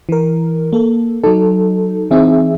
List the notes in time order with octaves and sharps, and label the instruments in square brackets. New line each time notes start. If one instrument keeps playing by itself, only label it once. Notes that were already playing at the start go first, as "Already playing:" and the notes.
[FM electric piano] E3 A#4
A#3 A4
[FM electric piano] F#3 D#4 [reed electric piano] A4
[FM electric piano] E3 C4 D#4 [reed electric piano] G#4 E5